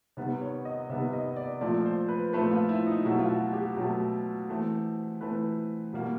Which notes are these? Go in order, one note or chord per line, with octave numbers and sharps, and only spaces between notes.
C3 D#3 G3 B3
C#5
D#5
C3 D#3 G3 B3 E5
D#5
D5
A#2 F3 A3 C4 D5
C5
B4
A#2 F3 A3 C4 B4
F4
E4
D#4
B2 F#3 A3 E4
F4
F#4
G4
B2 F#3 A3
E3 A3 C4
E3 A3 C4 B4
B2 G3 A#3